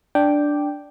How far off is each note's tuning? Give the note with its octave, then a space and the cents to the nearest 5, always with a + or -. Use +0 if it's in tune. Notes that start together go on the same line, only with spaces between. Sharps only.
D4 +0 G5 +0 D6 +0